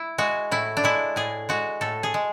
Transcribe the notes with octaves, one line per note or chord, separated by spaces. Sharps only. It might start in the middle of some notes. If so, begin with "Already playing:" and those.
Already playing: E4
G#3 F#4
A2 E4
D4
G#3 E4
A2 G#4
G#3 F#4
A2 A4
G#4
G#3